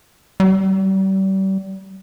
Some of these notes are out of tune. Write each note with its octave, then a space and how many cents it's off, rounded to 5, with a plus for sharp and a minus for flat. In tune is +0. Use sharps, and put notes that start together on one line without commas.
G3 -35